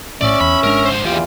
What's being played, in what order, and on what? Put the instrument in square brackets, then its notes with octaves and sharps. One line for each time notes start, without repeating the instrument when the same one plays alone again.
[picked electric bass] A#1 A2 [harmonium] C#4 E5 [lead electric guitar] D5
[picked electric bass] E2 [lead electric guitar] B5
[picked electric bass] G#1 G#3 D4 [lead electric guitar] A#4
[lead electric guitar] C#2 C5
[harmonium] E2 F4 [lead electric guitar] E3 G4